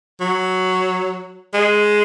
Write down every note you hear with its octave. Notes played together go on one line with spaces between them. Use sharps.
F#3
G#3